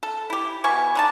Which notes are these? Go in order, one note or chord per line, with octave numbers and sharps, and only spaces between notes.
A4
E4 G4
B2 E5 G#5 C#6
D3 D#4 A5